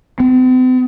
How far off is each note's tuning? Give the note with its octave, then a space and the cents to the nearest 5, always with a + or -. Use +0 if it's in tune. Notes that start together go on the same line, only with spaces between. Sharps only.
C4 -45